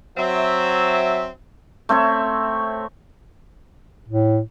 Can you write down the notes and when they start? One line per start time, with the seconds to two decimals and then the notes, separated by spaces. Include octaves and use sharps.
0.17 F#3 C4 E5
1.89 A3 C4 C#5 E5
4.09 A2